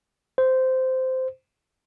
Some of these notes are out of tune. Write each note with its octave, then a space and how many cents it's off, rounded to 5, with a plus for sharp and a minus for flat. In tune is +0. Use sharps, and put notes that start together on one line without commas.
C5 -10